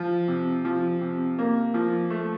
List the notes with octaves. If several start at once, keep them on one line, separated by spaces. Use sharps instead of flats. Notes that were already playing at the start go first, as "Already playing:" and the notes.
Already playing: F3
C3
F3
C3
A#3
F3
A3